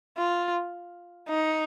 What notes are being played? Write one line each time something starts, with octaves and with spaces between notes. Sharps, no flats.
F4
D#4